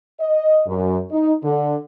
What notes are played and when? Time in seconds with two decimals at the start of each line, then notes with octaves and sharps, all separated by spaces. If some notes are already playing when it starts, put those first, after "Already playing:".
0.20 D#5
0.66 F#2
1.12 D#4
1.43 D3